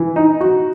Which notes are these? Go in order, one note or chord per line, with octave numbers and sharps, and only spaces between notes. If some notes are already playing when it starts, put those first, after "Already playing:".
Already playing: E3
D#4
F#4